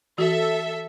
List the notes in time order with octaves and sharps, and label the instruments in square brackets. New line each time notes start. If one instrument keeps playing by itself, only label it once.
[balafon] E3 F#4 [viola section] A4 E5